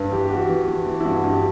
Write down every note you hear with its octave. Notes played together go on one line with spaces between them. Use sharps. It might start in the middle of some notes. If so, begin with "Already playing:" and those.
Already playing: G2 B4
E3 G4
G4
E3 F#4
E3
E3
E3
E4
G2 F#4
F#4
G2
G4